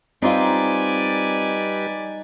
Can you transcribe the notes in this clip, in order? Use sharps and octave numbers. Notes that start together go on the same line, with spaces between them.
G3 C4 D#4 F4 B4 D5 G#5